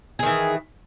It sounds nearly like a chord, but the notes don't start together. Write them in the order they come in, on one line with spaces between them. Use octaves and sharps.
G#4 D#3 E3